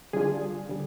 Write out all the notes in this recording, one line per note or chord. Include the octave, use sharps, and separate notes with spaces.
D3 G3 D4 F4 G#4
D3 G3